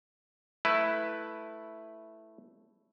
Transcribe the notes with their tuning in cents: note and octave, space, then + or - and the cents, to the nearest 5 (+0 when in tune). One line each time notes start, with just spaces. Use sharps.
A3 +0 E4 +0 B4 +0